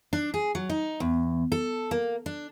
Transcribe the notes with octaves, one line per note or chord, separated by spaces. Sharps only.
D4
G#4
F#3
D#4
E2
A4
A#3
D4